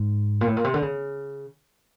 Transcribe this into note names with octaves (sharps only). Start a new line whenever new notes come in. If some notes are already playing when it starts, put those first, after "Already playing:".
Already playing: G#2
A#2
A2
A#2
C3
D3
C#3